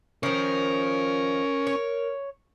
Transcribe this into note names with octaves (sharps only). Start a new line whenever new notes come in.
D#3 F3 C#4 A#4
C#5